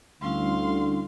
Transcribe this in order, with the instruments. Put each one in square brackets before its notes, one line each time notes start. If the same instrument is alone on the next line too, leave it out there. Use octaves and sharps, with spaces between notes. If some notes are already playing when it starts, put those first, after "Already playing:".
[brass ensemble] D2 D3 [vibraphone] G3 C#4 E4 [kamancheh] F5 C6